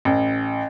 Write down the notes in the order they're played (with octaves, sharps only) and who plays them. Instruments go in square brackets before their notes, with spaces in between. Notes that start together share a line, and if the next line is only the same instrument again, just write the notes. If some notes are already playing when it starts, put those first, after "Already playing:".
[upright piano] A1